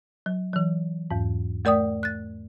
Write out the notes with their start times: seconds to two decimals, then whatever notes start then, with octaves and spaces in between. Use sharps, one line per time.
0.26 F#3
0.53 E3 F#3
1.11 E2 G#2
1.65 A3 A#4 D5 G5 D#6
2.03 F#6 A6